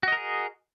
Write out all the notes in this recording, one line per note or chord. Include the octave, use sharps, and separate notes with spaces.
F#4 G#4 A#4 D#5